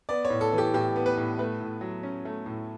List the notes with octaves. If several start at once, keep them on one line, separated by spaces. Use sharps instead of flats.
B3 D5
C#5
A2
A4
E3
G4
A2 G4
B3
B4
A2
A3 B4
A2
F#3
C#4
A3
A2